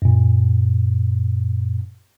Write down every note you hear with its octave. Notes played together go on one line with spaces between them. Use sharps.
F#2 A#2